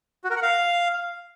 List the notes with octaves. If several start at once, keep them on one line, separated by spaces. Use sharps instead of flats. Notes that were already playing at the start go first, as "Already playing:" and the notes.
F#4
A#4
F#5
F5